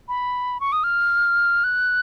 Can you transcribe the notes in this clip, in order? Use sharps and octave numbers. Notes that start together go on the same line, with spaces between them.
B5
C#6
D#6
F6
F#6